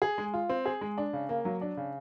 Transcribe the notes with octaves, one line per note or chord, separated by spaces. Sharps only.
G#4
G#3
F4
C4
G#4
G#3
D4
C#3
A#3
F#3
D4
C#3